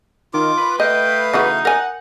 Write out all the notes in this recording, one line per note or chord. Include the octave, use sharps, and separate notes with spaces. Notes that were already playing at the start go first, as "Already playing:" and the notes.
D#3 F4 D6
B4
A3 D#5 F5 G5 D#6
C#3 E3 D#4 F#4
A#4 F#5 G#5